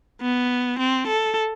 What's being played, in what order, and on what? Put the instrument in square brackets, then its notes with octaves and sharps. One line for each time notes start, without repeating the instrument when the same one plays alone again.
[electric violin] B3
C4
A4